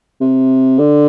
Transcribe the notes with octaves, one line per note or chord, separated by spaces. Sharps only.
C3
D3